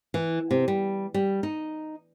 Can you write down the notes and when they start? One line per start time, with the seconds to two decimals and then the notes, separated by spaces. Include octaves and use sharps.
0.14 E3
0.51 C3
0.68 G3
1.14 G3
1.43 D#4